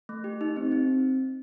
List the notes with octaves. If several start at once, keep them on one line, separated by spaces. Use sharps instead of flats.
A3
G4
D#4
C4
C4